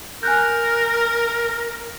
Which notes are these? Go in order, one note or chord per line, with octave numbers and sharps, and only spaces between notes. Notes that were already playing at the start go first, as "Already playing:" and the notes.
A#4 G#5 F#6 G6